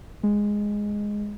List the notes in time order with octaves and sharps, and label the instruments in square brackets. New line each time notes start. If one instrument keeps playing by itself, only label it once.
[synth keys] G#3